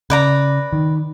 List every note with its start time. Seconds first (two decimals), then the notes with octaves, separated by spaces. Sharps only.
0.10 C#3 B4 D5 A#5
0.73 D#3